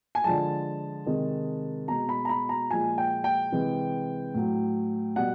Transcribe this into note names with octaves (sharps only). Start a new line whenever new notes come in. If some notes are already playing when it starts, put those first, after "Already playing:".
G#5
D3 F3 G#3 A5
C3 D#3 G#3
B2 G#3 A#5
B5
A#5
B5
A#5
A#2 F3 G#3 G#5
G5
G5
C3 E3 G#3
A2 F#3
B2 G3 F#5